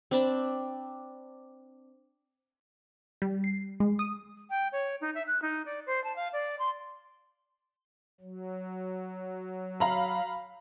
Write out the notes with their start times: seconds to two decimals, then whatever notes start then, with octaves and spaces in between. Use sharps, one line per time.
0.11 C4 D4 A5 B5
3.22 G3
3.44 C7
3.80 G#3
3.99 D#6
4.50 G5
4.72 C#5
5.01 D#4
5.15 E5
5.27 F#6
5.42 D#4
5.66 D5
5.87 C5
6.04 A5
6.16 F5
6.33 D5
6.59 C6
8.21 F#3
9.80 F5 A#5 B5